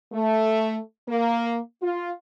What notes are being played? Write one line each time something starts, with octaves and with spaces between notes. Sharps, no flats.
A3
A#3
F4